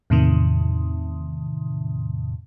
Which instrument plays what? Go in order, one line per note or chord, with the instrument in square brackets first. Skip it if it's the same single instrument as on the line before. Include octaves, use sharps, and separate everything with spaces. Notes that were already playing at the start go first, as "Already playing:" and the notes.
[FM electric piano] E2 A2 C3 D#3